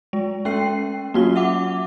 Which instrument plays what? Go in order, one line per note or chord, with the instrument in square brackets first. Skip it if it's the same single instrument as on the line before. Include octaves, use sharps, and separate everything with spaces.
[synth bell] G#3
[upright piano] A3 [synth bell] C#4 G5 C7
[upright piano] F#3 C#4 F4 [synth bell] A#3 F#4 G7
[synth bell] E5 F#5 D6